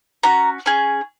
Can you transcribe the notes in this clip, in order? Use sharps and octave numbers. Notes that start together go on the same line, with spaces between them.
C#4 F#4 A#5
C#4 G#4